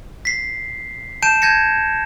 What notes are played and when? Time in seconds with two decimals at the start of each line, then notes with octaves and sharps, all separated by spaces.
0.25 B6 C7
1.22 A5 G6 D7 E7
1.42 A5 G6 G#6 A#6 C#7